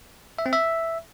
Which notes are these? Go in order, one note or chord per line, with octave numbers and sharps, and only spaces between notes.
E5
C4
E5